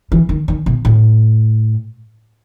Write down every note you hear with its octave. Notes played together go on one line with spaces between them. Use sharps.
E3
D#3
D#3
B2
A2